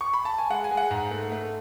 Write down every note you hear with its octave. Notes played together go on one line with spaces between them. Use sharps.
C#6
B5
A5
G#5
G#3 F#5
G#5
G#3
F#5
G#2
A3
A3